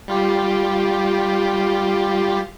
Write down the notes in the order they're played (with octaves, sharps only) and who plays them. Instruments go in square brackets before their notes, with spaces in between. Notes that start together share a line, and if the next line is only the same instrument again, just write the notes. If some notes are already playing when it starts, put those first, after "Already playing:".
[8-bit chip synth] G3 F4 G4